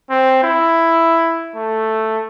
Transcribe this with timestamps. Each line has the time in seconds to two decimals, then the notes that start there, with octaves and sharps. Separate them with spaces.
0.10 C4
0.44 E4
1.56 A3